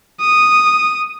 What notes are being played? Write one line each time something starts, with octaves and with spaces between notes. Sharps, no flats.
D#6